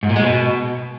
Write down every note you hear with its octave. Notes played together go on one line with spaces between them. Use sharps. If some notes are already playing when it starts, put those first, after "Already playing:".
G#2
A#2
G#3
B2